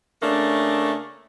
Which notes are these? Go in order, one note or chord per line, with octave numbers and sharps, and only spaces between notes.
C#3 A3 A#3 D4